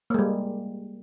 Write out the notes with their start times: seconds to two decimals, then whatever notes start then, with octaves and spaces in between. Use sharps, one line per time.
0.10 A#3
0.14 G#3
0.19 G3